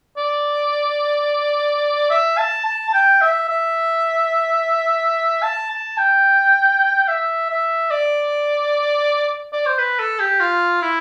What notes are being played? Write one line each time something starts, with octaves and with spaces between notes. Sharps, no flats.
D5
E5
A5
A5
A5
G5
E5
E5
A5
A5
G5
E5
E5
D5
D5
C5
B4
A4
G4
F4
E4